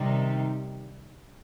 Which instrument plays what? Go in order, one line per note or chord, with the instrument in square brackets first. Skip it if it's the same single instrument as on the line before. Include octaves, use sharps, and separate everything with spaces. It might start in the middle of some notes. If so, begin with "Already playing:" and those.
Already playing: [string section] C3 D#3 G3 D#4